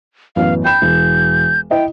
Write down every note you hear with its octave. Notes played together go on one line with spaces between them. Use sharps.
A1 F#2 B3 F5
G5 B5 G6 E7
E1
E4 D#5 G5